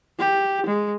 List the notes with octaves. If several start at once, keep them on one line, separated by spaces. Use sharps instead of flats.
G4
G#3